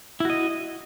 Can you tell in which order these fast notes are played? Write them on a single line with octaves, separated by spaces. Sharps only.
E4 F#4 D#5